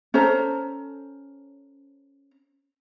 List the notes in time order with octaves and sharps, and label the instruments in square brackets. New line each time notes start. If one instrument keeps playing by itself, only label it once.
[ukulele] C#4 A4 C5 A#5